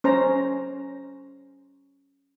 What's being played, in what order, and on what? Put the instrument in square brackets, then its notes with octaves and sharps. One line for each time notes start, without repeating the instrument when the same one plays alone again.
[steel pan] C#4 C5 A#5